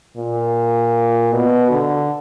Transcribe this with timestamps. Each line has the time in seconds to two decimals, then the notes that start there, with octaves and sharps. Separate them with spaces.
0.17 A#2
1.33 B2
1.71 D3